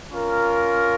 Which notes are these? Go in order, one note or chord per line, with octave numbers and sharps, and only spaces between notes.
C#4 F4 A#4